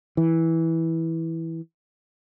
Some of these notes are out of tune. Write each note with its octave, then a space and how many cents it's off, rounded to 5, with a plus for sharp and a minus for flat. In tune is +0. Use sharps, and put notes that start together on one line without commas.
E3 -10